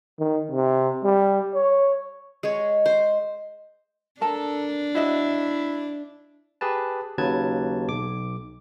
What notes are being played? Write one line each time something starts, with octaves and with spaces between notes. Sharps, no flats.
D#3
C3
G3
C#5
G#3 C#5
C5
D4 A4 A#4 A5
E4 F#4 D#5 E5
G4 G#4 B4 A5
D#2 C#3 F#3 B4 A5 G#6
B1 D6